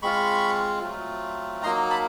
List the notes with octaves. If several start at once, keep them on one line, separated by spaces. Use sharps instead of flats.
G#3 C4 F4 B5 C#6
F#3 A3 C4 F4
F#3 A#3 D#4 A#5 C6
A5 B5